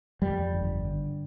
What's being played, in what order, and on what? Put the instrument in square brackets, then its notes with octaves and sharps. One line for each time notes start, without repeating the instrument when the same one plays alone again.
[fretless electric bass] F2 G3
G1
D3